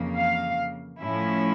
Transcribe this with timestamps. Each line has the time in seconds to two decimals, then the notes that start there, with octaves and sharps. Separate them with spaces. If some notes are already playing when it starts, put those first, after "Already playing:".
Already playing: F2 C#3 E3 A#3
0.17 F5
1.01 A2 F3 C#4 E4